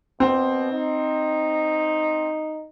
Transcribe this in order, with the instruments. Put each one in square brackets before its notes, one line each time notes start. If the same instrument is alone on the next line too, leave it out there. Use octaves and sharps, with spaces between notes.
[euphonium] B2 [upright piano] C4
[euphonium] D#4